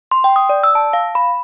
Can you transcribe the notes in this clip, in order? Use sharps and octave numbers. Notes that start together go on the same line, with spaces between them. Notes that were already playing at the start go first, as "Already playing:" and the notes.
C6
G5
D#6
D5
E6
A5
F5
B5